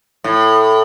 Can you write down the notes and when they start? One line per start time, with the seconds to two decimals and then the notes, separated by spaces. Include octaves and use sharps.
0.24 A2